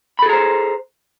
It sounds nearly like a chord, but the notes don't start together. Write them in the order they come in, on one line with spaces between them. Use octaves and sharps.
B5 A4 G#4 A#5 C5